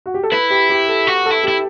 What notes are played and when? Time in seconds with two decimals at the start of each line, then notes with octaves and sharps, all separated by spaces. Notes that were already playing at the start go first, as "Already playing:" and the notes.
0.06 F#4
0.14 G4
0.23 A4
0.32 E4 B4
0.50 G4
0.70 G4
0.88 A4
1.07 F#4
1.26 A4
1.31 E4
1.44 E4 G4